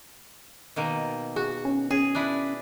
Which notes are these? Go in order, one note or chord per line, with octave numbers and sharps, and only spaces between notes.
B2 D#3 A#3
F#4 G#4
C#4
C#4 G#4
D4 E4 B4